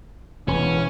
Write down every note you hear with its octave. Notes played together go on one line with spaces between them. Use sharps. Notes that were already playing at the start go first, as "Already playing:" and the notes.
E1 E2 E3 C#4